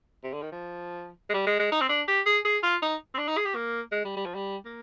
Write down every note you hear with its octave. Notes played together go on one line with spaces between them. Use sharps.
C3
D3
D#3
F3
G#3
G3
G#3
G#3
D#4
C4
D4
G4
G#4
G#4
F4
D#4
C4
D4
D#4
G#4
G4
A#3
G#3
G3
G3
F3
G3
A#3